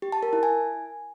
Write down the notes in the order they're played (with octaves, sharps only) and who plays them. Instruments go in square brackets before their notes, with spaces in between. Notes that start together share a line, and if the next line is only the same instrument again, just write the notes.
[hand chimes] G4
A5
A#4
E4
G#5